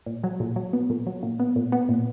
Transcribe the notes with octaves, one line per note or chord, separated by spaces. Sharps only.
A#2
F#3
A#2
F#3
B3
A#2
F#3
A#2
B3
A#2
B3
A#2